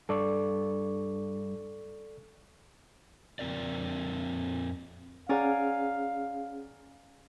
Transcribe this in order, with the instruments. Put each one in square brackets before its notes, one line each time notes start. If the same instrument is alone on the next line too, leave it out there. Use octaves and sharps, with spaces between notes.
[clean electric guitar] G2 [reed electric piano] A4 D5 C#6
[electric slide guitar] F2 C#3 C4 A#4 D5
[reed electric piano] C#4 G#4 F#5 [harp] D5 G#5 A#5 [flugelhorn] F5